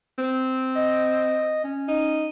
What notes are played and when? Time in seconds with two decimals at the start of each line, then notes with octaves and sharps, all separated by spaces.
0.18 C4
0.76 D#5
1.64 C#4
1.88 D#4